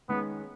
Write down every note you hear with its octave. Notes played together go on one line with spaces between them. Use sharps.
D#3 G#3 B3 C#4 G#4